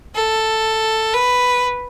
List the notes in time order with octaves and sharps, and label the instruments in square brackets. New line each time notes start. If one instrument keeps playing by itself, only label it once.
[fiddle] A4
B4